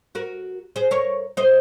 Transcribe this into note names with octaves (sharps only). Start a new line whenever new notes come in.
F#4 A#4
G#4 C5
A#4 C#5
C5 D#5